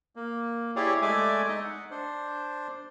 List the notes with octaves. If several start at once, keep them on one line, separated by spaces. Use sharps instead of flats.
A#3
E4 G4 G#4 C#5 D5
G#3 A3 D5 E5 G#5 D6
D#4 D#5
F#5
D4 C5